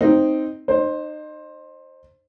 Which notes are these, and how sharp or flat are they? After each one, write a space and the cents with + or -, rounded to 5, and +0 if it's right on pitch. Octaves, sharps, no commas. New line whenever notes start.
C4 +0 D#4 +0
D#4 -30 C5 +15